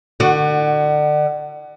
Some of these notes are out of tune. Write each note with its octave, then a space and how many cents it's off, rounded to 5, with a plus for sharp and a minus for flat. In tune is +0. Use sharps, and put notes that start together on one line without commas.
D3 +35 F#4 +0